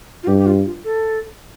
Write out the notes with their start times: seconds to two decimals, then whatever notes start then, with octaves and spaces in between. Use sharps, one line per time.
0.23 F4
0.27 G2 G4
0.38 G4
0.46 F4
0.65 F4
0.85 A4